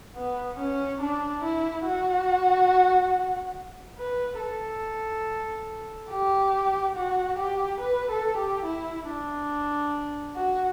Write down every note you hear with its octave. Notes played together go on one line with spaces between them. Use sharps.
B3
C#4
D4
E4
F#4
B4
A4
G4
F#4
G4
B4
A4
G4
E4
D4
F#4